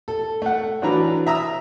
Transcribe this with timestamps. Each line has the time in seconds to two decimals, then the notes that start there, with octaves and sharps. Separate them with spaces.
0.08 A4
0.42 A3 F#5
0.82 A1 F#3 D4 B4 A#5
1.27 E5 A#5 D#6 E6